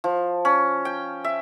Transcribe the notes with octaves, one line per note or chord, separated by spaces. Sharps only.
F3
C#4
G5
E5